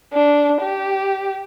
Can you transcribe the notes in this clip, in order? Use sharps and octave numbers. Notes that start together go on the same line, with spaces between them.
D4
G4